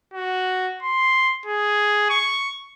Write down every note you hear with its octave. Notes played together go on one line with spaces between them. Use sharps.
F#4
C6
G#4
C#6